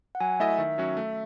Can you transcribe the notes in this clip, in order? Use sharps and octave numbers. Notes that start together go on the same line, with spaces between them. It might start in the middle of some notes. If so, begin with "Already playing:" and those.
F#5
F#3 G#5
A3 E4 A4 D#5 E5
D#3
F#3 C#4 F#4
A3